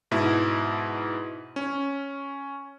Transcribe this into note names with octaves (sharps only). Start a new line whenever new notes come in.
G#2 B2 E4
C#4